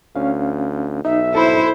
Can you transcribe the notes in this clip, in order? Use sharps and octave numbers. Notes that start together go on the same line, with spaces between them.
D2 C#4 F5
B1 D#4 E5
E4 A4 C5 B5